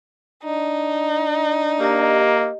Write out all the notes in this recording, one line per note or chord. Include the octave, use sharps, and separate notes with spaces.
D4 D#4
A#3 G4 D#5